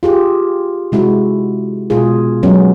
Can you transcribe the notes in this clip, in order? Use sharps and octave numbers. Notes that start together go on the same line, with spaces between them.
F4 G4 G#4
C3 G#3 E4 F#4
B2 G#3 F4 G#4
F#3 G#3 B3 C#4